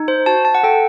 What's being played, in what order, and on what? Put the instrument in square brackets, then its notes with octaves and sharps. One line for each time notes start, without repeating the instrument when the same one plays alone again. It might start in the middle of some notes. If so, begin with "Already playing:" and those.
Already playing: [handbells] D#4
C5
F#4 A5
A5
F#5
A4 G5